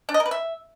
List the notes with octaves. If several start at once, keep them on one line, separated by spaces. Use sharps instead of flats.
D4
D#5
A#4
B4
E5